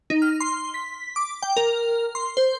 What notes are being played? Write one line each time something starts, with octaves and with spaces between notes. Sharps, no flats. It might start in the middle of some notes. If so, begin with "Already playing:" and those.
D#4
F6
C6
B6
D6
G5
A#4
C6
C5